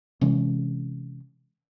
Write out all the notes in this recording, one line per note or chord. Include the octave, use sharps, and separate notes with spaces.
C3 E3 G#3 C#4